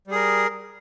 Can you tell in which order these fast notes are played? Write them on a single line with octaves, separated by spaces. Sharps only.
G3 G#4 A#4